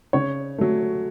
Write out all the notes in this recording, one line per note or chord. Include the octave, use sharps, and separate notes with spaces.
C#3 C#5
F#3 A3